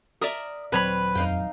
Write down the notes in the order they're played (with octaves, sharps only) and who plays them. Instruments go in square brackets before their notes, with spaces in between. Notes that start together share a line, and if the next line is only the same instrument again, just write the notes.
[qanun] A#4 D5 E5 [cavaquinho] D#6
[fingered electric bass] D#1 F#3 [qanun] C4 [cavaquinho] B4 C#5 B5
[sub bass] F2 [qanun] D#4 F5 G5